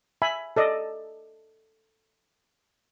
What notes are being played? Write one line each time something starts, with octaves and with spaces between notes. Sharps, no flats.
E5 G#5 B5
A4 D5 D#5